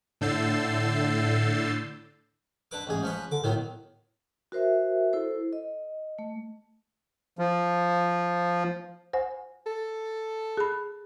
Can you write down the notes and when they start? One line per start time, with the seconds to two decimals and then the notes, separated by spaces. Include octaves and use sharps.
0.21 A2 D3 E6 G6 A6 C7
2.71 D3 B4 D6
2.87 A1 G#2 G#4
3.03 F3 C#4 B4
3.31 D3 D6
3.44 A2 D#3 F#3 B3
4.52 F#4 A#4 C5 E5
5.13 E4 A4 C5
5.53 D#5
6.19 A3
7.38 F3
9.13 C5 F#5 G#5
9.67 A4
10.57 G#4 B5